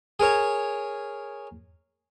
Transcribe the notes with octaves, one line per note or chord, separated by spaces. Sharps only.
G#4 A#4 C#5